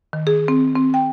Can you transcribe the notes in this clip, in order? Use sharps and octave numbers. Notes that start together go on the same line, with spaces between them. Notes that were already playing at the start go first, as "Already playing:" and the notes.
D#3
G#4
C4
C4
G5